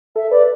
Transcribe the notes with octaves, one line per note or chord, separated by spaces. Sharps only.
A4 E5
B4 D5